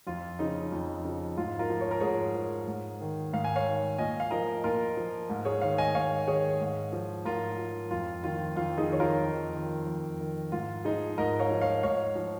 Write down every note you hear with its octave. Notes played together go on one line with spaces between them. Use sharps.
F2 F4
C#3 F3 D#4
F2
C#3 F3
G#2 F4
F4 A#4
F3
C#5
A#4
G#2 G#4 C#5
F3
G#2
D#3
G#2 F5
G#5
C#5 F5
D#3
A#2 D#5 G#5
F5
F3 A#4 D#5
A#2 F4 A#4
F3
G#2
G#4 C#5
D#3 C#5 F5
D#5 G#5
G#2 C#5 F5
D#3 G#4 C#5
G#2
F3
G#2 F4 A#4
F3
F2 F4
D#3 F4
F2 F4
D#4 G#4
D#3 C#5
F4 A#4
F2
D#3
F2
D#3
G#2 F4
F3 D#4 G#4
G#2 A#4 D#5
C#5 F5
F3
C#5 F5
G#2 C#5 F5
F3